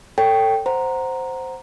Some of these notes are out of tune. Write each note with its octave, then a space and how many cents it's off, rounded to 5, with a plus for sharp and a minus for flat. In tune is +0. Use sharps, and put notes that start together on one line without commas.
A4 +25 C#5 +0 G5 +0
C5 +0 F#5 +0 A#5 +0